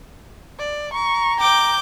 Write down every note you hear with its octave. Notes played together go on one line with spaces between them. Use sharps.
D5
A#5 C#6
G5 D6 G6